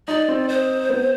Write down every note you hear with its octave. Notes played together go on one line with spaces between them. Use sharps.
D#4 D5
C4
C5
B3